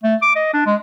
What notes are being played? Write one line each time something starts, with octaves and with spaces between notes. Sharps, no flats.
A3
D6
D#5
D4
G#3